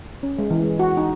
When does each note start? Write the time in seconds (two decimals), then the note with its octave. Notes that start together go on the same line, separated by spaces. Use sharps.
0.23 C#4
0.39 G#3
0.50 E3
0.63 G#3
0.80 F#4
0.97 D#4